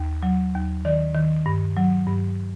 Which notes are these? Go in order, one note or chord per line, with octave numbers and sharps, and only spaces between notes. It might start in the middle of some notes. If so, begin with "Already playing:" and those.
Already playing: D#2
F#3
D#2
D#3 D5
D#3
G2
F#3
G2